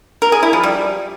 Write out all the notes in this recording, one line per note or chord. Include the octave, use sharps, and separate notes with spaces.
A#4
G#4
E4
F3
G3